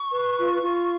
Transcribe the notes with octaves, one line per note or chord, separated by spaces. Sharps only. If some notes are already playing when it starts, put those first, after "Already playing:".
Already playing: C#6
B4
F4
F4